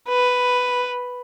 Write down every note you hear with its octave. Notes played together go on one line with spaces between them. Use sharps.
B4